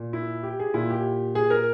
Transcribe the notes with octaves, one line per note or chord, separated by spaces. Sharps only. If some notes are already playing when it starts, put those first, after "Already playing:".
Already playing: A#2
E4
G4
G#4
A#2 E4
G4
G#4
A#4